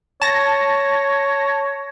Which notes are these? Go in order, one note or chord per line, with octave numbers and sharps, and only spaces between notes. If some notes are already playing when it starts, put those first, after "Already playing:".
C#5 A5 A#6